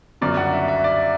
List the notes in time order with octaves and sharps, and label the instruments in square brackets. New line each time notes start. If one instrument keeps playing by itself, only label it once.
[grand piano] G1 F#2 C#3 D5
F#5
E5
E5
D5